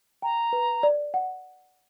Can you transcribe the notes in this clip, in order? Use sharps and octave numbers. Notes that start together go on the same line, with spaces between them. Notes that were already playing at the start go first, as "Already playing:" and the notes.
G5 A#5
B4
D5
F#5